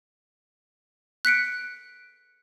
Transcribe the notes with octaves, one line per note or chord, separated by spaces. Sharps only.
F#6 B6 C#7 D7